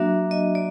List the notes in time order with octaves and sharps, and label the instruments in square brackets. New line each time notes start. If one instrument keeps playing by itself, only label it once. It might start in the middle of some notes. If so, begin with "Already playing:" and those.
Already playing: [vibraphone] F#3 A#3 D4 F#4 E5
D#5
D5